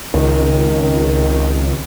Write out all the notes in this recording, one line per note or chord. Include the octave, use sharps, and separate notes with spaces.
C#2 C3 D#3